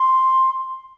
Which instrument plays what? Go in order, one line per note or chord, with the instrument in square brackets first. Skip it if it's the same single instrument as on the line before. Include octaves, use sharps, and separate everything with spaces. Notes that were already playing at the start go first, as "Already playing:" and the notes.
Already playing: [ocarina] C6